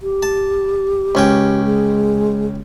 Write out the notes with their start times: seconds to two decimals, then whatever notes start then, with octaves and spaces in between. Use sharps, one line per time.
0.01 G4
0.23 A5
1.15 C#2 C#4 G5
1.64 G#3